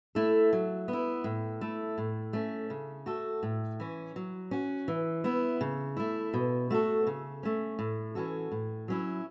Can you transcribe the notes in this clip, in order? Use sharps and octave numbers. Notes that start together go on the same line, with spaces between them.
A3 E4 A4
F#3
B3
E4
A2
A3 E4 A4
A2
A3 C#4
C#3
A3 F#4 A4
A2
E3 C#4
F#3
C#4 F#4
E3
B3 E4
C#3
A3 E4
B2
A3 F#4 A4
C#3
A3 C#4
A2
E3 C#4 F#4 A4
A2
F#3 C#4 E4